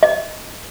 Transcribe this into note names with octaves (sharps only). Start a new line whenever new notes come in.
D#5